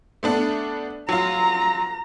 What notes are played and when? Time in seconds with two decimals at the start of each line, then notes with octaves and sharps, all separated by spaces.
0.23 A3 B3 D4
1.09 F#3 F4 A#5